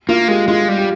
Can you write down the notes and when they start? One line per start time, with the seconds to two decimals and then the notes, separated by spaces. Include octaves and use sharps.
0.08 A#3 F4
0.28 G#3 G4
0.48 G#3 F4
0.69 G3
0.78 G4